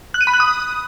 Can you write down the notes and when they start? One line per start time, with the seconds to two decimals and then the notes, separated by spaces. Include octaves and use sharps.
0.14 F#6
0.21 D#7
0.27 B5
0.33 F#6
0.40 D#6